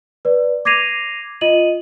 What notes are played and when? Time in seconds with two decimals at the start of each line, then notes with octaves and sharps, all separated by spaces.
0.25 B4 D5
0.65 D6 G#6 A#6 C7 D#7 F7
1.41 F4 D#5 D#7 F#7